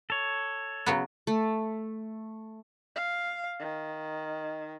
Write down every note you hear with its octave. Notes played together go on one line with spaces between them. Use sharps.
A4 C#5
C#3 F#3 B3
A3
F5
D#3